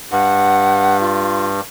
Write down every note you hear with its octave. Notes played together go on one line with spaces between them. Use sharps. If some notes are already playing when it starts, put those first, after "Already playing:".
G2 F#5
F4